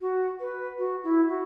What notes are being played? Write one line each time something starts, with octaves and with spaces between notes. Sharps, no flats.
F#4
B4
F#4
E4
F#4